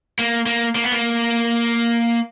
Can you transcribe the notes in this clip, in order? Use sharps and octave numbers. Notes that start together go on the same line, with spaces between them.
A#3
A#3
A#3
B3
A#3